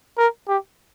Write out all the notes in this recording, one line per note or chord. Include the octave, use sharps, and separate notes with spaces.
A#4
G4